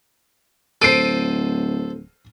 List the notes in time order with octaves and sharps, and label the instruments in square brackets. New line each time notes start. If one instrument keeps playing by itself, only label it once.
[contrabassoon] D1 [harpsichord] A4 C5 [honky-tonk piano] C7 D7 D#7